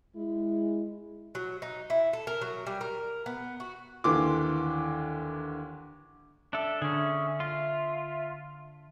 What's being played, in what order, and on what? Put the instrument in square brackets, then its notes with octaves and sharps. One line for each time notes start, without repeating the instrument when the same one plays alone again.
[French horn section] G#3 E4
[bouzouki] F#3
D#4
E4
A4
A#4
F#3
G3
A#4
B3
F#4
[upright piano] D#2 D3 E3 C6 D6
[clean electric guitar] D4 A4 [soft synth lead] E5
[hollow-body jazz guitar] D3 [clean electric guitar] C#4 G#4
[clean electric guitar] F4